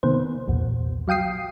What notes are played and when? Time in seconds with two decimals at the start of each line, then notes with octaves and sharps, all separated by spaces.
0.03 C3 D#3 A#3 B3 C5
0.48 B1 E2 A#2
1.08 F#3 F5 G5 D#6 C7